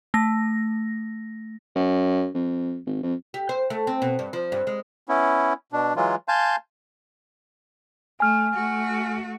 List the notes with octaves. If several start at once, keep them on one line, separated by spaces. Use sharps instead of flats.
A3 A#6
F#2
F2
G#1
F2
G4
C5
A3
C4
B2
G2
F3
G2
G#3
B3 C#4 E4
B2 D4
E3 F#3 G#3 F4
F5 G#5 A5 C6 G6
A3 G#5 F6
A3 F#4